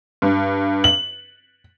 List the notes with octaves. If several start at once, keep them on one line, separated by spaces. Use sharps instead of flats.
G2
F#7